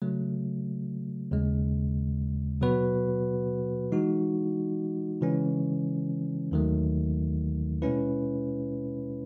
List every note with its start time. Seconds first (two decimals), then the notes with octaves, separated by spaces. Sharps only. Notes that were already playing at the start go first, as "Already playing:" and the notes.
0.02 C#3 F#3 A3
1.31 D#2 C#3 G#3
2.61 B2 F#3 B3 F#4 B4
3.92 E3 G#3 D#4 F#4
5.21 C#3 E3 G#3 C#4
6.51 D#2 D#3 F#3 A3
7.82 B2 G#3 C#4 E4 B4